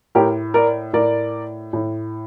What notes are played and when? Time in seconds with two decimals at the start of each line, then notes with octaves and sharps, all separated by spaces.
0.15 A2 G4 A#4
0.54 A#4 D5
0.93 A2 A#4 D5
1.73 A2